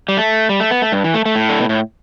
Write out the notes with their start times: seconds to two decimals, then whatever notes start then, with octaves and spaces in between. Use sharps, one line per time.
0.09 G3
0.17 A3
0.49 G3
0.60 A3
0.71 B3
0.82 A3
0.92 G2
1.04 E3
1.14 A3
1.26 A3
1.36 A2
1.49 D3
1.59 B2
1.69 A2